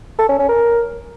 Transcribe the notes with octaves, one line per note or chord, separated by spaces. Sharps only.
A4
C#4
C#4
A#4